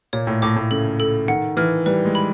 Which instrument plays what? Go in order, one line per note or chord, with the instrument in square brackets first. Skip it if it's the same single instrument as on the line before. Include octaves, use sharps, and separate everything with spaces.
[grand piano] A#2 [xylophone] C#5
[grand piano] A2
[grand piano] A2 [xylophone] D6
[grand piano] A2
[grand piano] C#3 [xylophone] A4
[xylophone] A4
[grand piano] D#3 [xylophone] F#5
[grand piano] E3 [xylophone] F6
[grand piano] G3 [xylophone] B4
[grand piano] G#3
[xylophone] B5